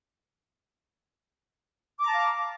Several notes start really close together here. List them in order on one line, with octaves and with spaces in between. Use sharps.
D6 A#5 A5 F5